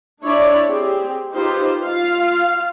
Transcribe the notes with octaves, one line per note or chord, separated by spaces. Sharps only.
D4 E4 C#5 D5
C4 G4 G#4
D#4 F4 G4 B4 C5
F4 F5